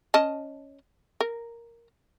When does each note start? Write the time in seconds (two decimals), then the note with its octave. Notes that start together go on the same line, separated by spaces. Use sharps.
0.14 C#4 D#5 A5
1.21 A#4